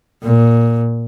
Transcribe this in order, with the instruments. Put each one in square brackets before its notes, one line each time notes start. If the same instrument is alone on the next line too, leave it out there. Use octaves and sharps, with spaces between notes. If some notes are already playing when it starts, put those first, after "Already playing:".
[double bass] A#2